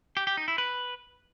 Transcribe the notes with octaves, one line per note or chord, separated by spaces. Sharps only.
G4
G4
D#4
E4
B4